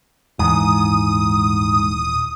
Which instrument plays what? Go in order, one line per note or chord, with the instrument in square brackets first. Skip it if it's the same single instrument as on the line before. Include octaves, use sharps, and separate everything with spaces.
[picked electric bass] D#1 E3 [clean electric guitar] G#2 [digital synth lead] D#6